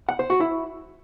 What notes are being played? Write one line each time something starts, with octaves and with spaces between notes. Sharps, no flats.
F#5
C5
F#4
E4